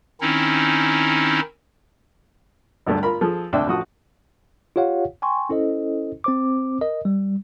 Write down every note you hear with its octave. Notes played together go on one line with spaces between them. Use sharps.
D#3 C4 C#4 D#4 E4
G#1 D2 G2 A3
F4 A#4 B5
F3 G#4 A4
D2 C3 D4 E5 G5
A1 F3 F#4 D#6
F4 G4 C#5 F5 F#5
G5 G#5 C6 C#6
C#4 E4 A4 C5 D#5
C4 C5 D6
A#4 D#5
G3